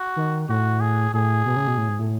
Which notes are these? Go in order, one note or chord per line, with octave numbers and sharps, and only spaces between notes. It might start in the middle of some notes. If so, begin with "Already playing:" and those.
Already playing: F#4
D#3
A2 F#4
G#4
A2 G#4
B2
C#3
B2
A2
G#2
A2